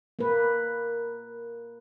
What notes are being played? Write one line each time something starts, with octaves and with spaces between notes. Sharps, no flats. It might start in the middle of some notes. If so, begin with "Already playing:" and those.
A#3 B4